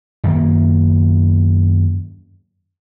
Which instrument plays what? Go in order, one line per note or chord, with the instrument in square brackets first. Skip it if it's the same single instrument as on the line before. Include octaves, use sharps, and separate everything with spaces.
[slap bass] F#2 D#3 A#3